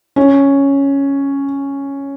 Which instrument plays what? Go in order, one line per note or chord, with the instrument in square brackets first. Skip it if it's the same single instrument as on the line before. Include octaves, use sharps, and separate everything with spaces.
[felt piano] C#4